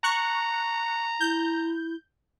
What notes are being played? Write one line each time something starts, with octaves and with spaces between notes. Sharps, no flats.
A#5 C#6 F#6 C#7
E4 G6